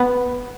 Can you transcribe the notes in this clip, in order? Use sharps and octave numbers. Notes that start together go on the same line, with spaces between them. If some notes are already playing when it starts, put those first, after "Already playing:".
Already playing: B3